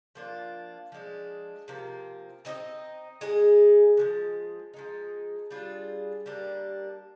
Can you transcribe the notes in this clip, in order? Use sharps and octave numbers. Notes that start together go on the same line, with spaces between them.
F3 A#3 D4 F4
F3 G#3 D4
C3 F3 A#3
C4 D#4 G#4 D#5
G#3 D#4 G#4
D3 F3 G#3
F3 G#3 D#4
G3 D4 F4 G#4
G3 A#3 D4